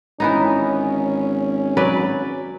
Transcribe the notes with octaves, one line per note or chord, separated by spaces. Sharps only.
G#1 E3 B3 C#4 D#4
F#3 B4 D5